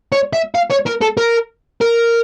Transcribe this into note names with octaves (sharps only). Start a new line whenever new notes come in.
C#5
E5
F5
C#5
A#4
A4
A#4
A#4